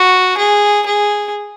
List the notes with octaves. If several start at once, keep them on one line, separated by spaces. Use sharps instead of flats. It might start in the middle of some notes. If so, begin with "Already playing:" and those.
Already playing: F#4
G#4
G#4